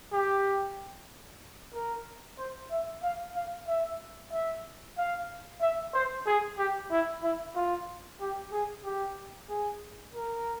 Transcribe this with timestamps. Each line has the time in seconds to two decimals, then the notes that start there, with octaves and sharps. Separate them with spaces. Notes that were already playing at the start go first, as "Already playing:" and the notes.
0.12 G4
1.74 A#4
2.38 C5
2.71 E5
3.03 F5
3.35 F5
3.68 E5
4.32 E5
4.98 F5
5.61 E5
5.93 C5
6.26 G#4
6.58 G4
6.91 E4
7.23 E4
7.56 F4
8.21 G4
8.52 G#4
8.85 G4
9.50 G#4
10.14 A#4